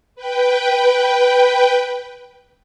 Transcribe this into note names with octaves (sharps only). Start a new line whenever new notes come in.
B4 G5